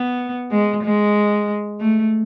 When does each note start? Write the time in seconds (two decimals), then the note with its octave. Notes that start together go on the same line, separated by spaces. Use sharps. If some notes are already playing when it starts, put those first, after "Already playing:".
Already playing: B3
0.51 G#3
0.83 G#3
1.80 A3